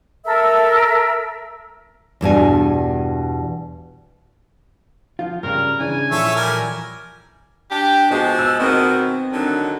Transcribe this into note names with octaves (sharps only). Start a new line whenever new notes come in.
A4 A#4 E5 E6
E2 G2 B2 G#5
F3 F4
G2 C#3 A#4
C#3 E3 D4 G#5
A#2 E3 F3 A4 C#5 E5
G3 A#4 G#5
D4 G4
F3 G#3 B3 F#4 B4
E6
B2 D#3 A#3 C4
D3 D#3 F#3